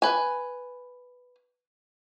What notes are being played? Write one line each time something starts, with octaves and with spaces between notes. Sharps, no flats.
B4 G#5